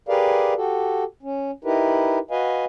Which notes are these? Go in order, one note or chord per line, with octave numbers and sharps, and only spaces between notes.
G4 G#4 A#4 B4 D5 F5
F#4 G4 A4
C#4
D#4 E4 G4 A#4 B4
F#4 B4 D#5 F5 G#5